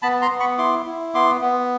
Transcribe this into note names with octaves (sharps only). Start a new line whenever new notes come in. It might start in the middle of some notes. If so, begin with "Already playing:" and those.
B3 A5 B5
A#5 C6
B3
B5 C#6
E4 C6 D6
E4
B3 C6 D6
B3